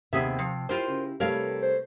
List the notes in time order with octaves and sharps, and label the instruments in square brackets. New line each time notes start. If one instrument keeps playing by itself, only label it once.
[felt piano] D#2 C4 [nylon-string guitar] C3 [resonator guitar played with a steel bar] B3 G#4 E5
[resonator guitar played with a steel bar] F3 [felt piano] C7
[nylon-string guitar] E4 G4 [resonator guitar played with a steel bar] F4 A#4 C5
[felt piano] C#3
[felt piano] C3 G3 A5 [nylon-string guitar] A3 B4 [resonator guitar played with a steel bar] A#4 C#5 F5
[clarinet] C5